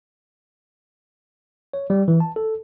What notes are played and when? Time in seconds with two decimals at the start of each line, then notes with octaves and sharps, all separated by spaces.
1.73 C#5
1.90 G3
2.08 E3
2.20 A5
2.36 A4